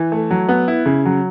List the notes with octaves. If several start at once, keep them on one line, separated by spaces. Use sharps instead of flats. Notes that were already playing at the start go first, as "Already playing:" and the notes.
Already playing: E3
A3
F#3
B3
E4
C#3
F#3